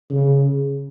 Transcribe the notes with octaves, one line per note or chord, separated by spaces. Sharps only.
C#3